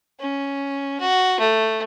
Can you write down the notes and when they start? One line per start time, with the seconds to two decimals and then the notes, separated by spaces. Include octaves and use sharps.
0.20 C#4
1.00 F#4
1.39 A3